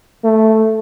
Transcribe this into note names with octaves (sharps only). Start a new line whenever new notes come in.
A3